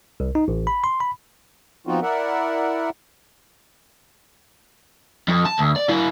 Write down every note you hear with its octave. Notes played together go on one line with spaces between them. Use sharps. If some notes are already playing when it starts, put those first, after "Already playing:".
C2
D#4
A1
B5
C6
B5
F3 B3 C4 D#4 F4 F#4
E4 A#4 D5 E5 F#5
F2
A5
D2
D5
F#3 E4